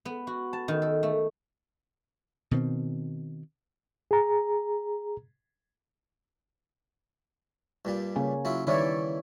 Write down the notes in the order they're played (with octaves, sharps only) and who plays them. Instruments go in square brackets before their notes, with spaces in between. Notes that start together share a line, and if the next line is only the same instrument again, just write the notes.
[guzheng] B3
F#4
A5
D#3
A4
A3
[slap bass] B2 D#3 C4
[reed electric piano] G#4 A#5
[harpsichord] G2 A#2 G3
[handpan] C#3 A#3 C#4
[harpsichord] F#3 E4 F4
[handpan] D#3 C#5 D5 [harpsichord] E3 G3 E4